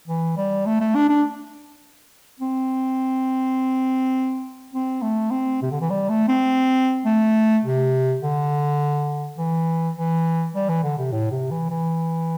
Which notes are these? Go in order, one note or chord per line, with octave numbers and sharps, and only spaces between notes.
E3
G3
A3
A3
D4
D4
C4
C4
A3
C4
C3
D3
E3
G3
A3
C4
A3
C3
D3
E3
E3
G3
E3
D3
C3
A2
C3
E3
E3